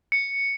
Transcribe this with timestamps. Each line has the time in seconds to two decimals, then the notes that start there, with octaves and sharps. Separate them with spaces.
0.12 C#7